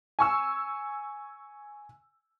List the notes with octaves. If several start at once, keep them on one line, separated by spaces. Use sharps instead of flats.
G#5 C#6 E6